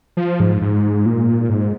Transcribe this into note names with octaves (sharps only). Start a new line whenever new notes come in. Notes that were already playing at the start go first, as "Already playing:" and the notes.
F3
G#2
G#2
A#2
G#2